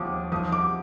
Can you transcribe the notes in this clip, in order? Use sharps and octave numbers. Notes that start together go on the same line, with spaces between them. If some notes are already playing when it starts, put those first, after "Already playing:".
Already playing: D#2 F3 D6 D#6
F3 D#6
D6